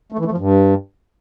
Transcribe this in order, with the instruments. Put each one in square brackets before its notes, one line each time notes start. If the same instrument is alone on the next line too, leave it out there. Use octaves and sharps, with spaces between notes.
[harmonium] A3
E3
A3
F3
G2